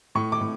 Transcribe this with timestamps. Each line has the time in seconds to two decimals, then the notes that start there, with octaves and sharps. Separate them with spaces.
0.15 A2 C#6
0.32 D6
0.41 A2